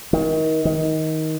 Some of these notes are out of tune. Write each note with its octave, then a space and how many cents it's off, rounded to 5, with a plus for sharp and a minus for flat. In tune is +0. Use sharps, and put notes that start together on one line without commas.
D#3 +30
D#3 +15